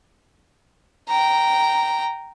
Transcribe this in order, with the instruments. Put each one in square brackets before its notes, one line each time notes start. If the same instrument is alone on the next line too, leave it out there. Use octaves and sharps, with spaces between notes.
[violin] G5 A#5